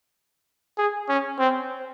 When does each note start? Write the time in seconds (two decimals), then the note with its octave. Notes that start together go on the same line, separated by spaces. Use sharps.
0.78 G#4
1.09 C#4
1.39 C4